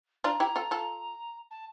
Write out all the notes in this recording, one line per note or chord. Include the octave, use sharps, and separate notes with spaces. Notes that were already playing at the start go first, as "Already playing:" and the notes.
D4 F4 A#5
E4 G4
F4 A4
F4 A4
A5